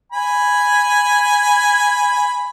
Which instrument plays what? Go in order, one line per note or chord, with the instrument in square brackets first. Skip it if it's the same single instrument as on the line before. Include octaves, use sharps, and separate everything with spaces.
[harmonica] G#5 B5